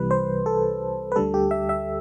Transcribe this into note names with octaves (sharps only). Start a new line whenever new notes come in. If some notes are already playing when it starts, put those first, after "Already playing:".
Already playing: C2 C3 E3 G3 B4
C5
A4
B4
D2 D3 G3 A4
G4
E5
E5